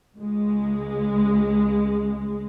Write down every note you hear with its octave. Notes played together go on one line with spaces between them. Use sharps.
C#2 G#3